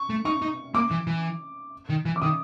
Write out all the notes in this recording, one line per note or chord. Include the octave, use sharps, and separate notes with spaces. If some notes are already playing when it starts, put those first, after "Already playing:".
Already playing: C#6
A3
D#4 C#6
D#4
A#3 D6
E3
E3
D#3
E3
D6
D#3 D#6